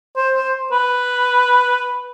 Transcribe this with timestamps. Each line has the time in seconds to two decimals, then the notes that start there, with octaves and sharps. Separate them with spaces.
0.16 C5
0.35 C5
0.72 B4